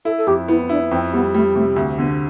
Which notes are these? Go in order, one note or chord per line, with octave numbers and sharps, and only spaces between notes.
E4 A4
A4
F2 G4
B3 E4
D4 E4
F2 C4
G3 B3
G3 A3
C3 A3
D2 C4
D3 B3